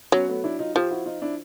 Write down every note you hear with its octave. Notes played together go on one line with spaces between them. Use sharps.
F#3 B3 C#4
A3 B3
D4 E4
D#4 F4
F3 F4 G4
E4 F#4
D#4 F4
D4 E4